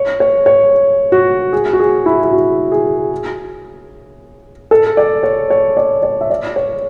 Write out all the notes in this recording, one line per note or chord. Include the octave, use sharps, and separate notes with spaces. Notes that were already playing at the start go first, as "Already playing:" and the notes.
Already playing: C#5
C#5
C#5
F#4
G#4
F#4
G#4
E4
E4
F#4
G#4
A4
D5
C#5
C#5
D5
D5
E5
D5
C#5